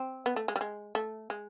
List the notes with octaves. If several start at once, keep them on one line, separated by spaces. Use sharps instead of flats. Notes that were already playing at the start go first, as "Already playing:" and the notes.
Already playing: C4
B3
A3
G#3
G3
G#3
A3
G#3